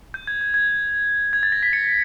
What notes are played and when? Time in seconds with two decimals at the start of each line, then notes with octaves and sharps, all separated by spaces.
0.14 G6
0.27 G#6
0.41 G#6
0.54 G#6
1.33 G#6
1.43 A6
1.52 A#6
1.63 B6
1.73 C#7